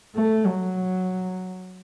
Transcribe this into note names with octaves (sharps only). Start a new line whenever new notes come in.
A3
F#3